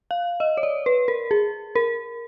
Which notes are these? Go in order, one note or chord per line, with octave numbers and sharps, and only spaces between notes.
F5
D#5
C#5
D5
B4
A#4
G#4
A#4